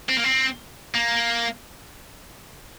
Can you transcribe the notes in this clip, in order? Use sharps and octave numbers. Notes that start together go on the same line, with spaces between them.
C4
A#3
C4
A#3